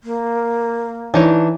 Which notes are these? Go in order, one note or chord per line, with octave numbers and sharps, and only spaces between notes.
A#3
E3 D4 D#4 C#5